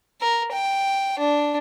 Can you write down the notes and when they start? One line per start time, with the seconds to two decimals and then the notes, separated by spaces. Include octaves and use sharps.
0.21 A#4
0.52 G5
1.19 D4